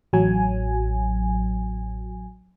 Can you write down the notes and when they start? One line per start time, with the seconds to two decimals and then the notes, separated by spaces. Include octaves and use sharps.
0.13 A1 F#3 G#5